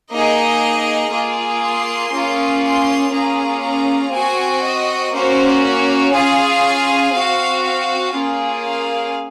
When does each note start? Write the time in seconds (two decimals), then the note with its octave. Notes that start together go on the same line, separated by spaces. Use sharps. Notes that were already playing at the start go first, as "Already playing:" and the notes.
0.11 A#3 D#4 G#4 D#5
1.11 A#3 F4 G#4
1.62 C6
2.12 A#3 C#4 F4 G#4
2.62 C6
3.12 A#3 C#4 F4 G#4 A#5
3.62 A#5
4.12 C4 F#4 G#5
4.62 D#5
5.12 A#3 C#4 F#4 C5
5.63 C#5
6.12 C#4 F4 G#4 G#5
7.13 C4 F#4 F5
7.63 F5
8.13 A#3 C#4 F4 G#4
8.63 F5